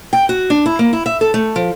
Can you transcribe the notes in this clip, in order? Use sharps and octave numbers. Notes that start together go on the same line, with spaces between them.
G5
F#4
D4
E4
A#3
E4
E5
A4
A3
F3